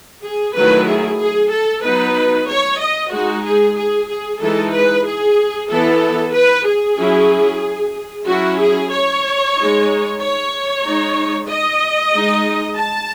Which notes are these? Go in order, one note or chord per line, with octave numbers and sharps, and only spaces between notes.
G#4
D#3 F#3 A3 E4 B4
G#4
G#4
A4
F#3 B3 D#4 B4
C#5
D#5
G#3 D#4 F#4
G#4
G#4
G#4
E3 G#3 D#4 A4
B4
G#4
E3 B3 E4 A4
B4
G#4
F#3 C#4 E4
F#3 C#4 E4 F#4
G#4
C#5
D#4
G#3
C#5
G#3 D#4
D#5
G#3 D#4
A5